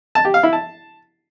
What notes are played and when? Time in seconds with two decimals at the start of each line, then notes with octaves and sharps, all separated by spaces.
0.15 A5
0.25 G4
0.34 F5
0.43 E4
0.53 A5